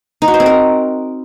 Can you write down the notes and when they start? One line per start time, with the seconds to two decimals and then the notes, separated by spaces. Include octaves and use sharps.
0.22 D#4
0.28 F#4
0.34 C5
0.40 C4
0.46 A#4